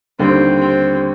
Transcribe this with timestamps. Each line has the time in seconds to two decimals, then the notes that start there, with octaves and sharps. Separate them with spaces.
0.19 D#2 D3 G3 C4
0.59 C4